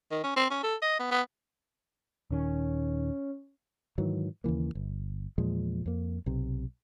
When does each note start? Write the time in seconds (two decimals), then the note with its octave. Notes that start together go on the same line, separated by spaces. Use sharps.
0.11 D#3
0.24 C#4
0.36 C4
0.50 C#4
0.63 A4
0.82 D#5
1.00 B3
1.11 B3
2.31 D#1 D#3 C#4
3.98 G#2 D#3 E3 F#3
4.44 D#2 C#3 E3 A#3
4.75 G1
5.38 E2 A#2 F3 G#3
5.86 F2 A#3
6.26 B1 C3